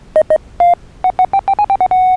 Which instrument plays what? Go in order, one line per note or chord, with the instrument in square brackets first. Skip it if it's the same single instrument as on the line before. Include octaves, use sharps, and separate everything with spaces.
[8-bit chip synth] D#5
D#5
F5
F#5
F#5
G5
G5
G#5
G5
F#5
F#5